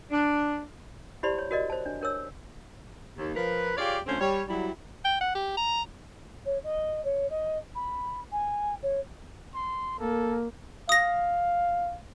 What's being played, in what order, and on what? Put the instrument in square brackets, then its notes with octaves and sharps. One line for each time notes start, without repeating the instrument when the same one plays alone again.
[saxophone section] D4
[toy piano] E4 G4 C5 D5 B5 C6
C#5
F#4 A#4 D5 D#5
C5 A5
D4
D4 A#4 C#5 E6
[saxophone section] D#2
F3 A#4 B4
F4 G4 G#4 C#5 D5 F5
D3 F3 A3 C4 C#4 C5
G3 C#5
F#3 G3 E4
[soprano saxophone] G5
F#5
G4
A#5
[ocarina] C#5
D#5
C#5
D#5
B5
G#5
C#5
[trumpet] C6
[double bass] A#3 [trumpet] A4
[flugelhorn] F5 [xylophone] D#6 A#6